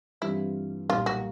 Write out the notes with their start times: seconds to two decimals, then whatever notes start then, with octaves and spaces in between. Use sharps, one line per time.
0.21 G2 E3 G3 C4 E4 F4
0.89 B1 A#2 G3 A#3 F4
1.06 F#4